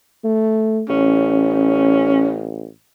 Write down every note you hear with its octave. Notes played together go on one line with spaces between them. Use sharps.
A3
A1 C#4